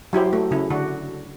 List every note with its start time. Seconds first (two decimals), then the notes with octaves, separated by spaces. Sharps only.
0.13 F#3 E4 G4 C5
0.33 A3
0.51 C#3 E4
0.70 D3 D4 F#4